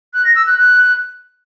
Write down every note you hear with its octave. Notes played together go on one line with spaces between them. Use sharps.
F#6
A#6
E6
F#6
F#6